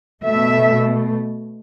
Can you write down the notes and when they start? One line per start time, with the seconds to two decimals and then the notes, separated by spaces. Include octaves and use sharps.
0.22 B2 A3 E5